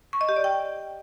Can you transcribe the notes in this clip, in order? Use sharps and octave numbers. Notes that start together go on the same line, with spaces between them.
C#6
D#5
G4
D5
G5